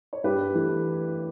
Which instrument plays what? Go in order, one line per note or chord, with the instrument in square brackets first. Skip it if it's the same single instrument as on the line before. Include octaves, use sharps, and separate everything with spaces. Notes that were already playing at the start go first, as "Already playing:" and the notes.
[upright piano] C#5
G2 G4 B4
E3 A3